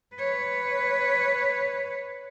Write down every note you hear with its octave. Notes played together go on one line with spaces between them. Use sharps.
B4 C#5